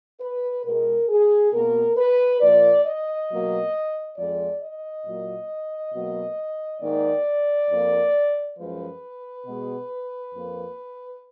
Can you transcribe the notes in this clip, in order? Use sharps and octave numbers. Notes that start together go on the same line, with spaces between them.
B4
B2 G#3 A#4
G#4
B2 A#3 A#4
B4
A#2 F3 A#3 D5
D#5
B2 F#3 A#3
F2 F3 G#3 D5
D#5
A#2 F#3 A#3
B2 F#3 A#3
G#2 D#3 A#3 D5
F2 F3 A#3
F#2 F3 G#3 B4
B2 G#3
F2 F3 A#3